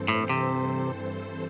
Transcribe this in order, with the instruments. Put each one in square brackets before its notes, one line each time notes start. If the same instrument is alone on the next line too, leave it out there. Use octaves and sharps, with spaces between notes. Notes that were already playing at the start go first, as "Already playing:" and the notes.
Already playing: [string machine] G2 E3 C4 A4 C5
[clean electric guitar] A2
C3